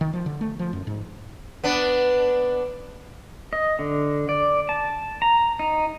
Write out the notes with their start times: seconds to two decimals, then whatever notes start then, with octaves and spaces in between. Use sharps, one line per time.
0.01 D#3
0.13 F3
0.26 D3
0.41 A3
0.59 F3
0.73 F#2
0.87 G#2
1.64 B3 D4
3.53 D#5
3.79 D3
4.29 D5
4.69 A5
5.22 A#5
5.59 D#4